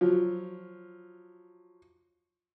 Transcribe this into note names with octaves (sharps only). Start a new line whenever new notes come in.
F3 F#3